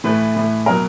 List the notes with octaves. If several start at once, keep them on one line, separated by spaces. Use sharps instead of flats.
A2 E3 A3 B4
A2 E3 A3
B2 F#3 A#4